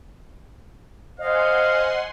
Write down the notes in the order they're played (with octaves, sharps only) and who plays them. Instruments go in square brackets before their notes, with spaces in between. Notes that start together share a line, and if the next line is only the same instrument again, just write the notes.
[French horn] C5 [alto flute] D#5 [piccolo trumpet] F5 [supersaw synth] F#5 G#5 C6